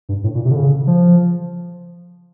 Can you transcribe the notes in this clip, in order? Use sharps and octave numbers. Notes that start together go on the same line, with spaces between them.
G2
A2
A#2
C3
D3
C#3
F3